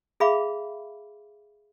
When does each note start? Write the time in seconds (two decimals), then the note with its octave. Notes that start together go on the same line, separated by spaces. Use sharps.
0.20 G#4 E5 F5 B5 D6